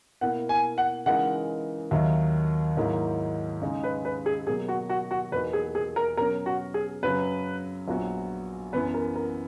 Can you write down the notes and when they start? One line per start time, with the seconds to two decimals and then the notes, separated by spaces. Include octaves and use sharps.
0.21 B2 A#3 E4 A#4 F#5
0.49 G#5
0.78 F#5
1.06 C#3 E3 G#3 D#4 A#4 F#5
1.91 D#2 D#3 F#3 E5
2.77 G#2 D#3 F#3 A#3 E4
3.62 C#3 G#3 D#4
3.84 B4
4.05 B4
4.26 G#4
4.47 B2 F#3 A#3 G#4
4.68 F#4
4.89 F#4
5.11 F#4
5.32 E2 B2 A#3 D#4 F#4 B4
5.53 G#4
5.75 G#4
5.96 A#4
6.17 B2 F#3 C#4 A#4
6.46 F#4
6.74 G#4
7.03 F#2 C#3 F#3 B4
7.88 A#1 A#2 F#3 B3 F#4
8.73 F#2 E3 B3 B4
8.94 A#4
9.16 A#4